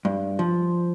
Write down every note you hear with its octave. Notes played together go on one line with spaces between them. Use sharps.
G2
F3